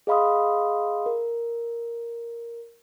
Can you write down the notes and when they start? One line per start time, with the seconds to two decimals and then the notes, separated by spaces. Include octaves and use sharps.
0.07 G#4 D#5 F5 B5 C6 D#6
1.06 A#4